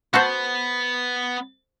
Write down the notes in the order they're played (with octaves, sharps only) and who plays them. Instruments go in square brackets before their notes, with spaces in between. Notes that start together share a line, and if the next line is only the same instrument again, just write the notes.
[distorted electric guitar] B3 [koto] F#4 A4 C5